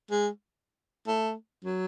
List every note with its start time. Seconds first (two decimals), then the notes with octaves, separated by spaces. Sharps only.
0.11 G#3
1.07 A3
1.65 F#3